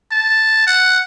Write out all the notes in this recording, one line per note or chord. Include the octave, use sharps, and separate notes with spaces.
A5
F#5